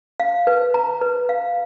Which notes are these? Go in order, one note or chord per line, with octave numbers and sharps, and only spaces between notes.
F5
B4
A#5
B4
F5